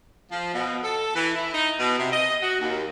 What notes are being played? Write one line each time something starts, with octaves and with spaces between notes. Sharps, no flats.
F3
B2
A4
E3
E4
D#4
B2
C3
D#5
F#4
D#2